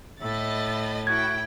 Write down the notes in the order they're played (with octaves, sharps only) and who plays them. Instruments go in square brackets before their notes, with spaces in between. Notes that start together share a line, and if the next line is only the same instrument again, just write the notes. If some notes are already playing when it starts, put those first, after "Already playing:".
[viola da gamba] A2 [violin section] D#5 B5 A6 [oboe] E5
[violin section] E4 G5 [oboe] F#4 [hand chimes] G#6